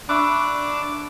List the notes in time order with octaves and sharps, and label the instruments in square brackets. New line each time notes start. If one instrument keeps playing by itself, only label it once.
[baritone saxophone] D4 [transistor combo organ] D5 D6 [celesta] E5 E6 F#6 [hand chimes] B5 C#6